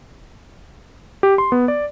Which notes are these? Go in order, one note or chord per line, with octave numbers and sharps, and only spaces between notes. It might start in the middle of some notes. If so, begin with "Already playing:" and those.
G4
C6
B3
D5